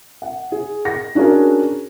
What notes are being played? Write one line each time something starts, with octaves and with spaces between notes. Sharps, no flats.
F#5
G#4
A#6
C#4 D4 F#4 G#4 A#4